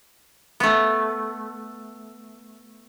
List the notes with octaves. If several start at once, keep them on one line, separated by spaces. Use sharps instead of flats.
A3 B3